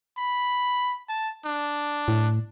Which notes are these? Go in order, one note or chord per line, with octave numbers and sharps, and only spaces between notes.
B5
A5
D4
A2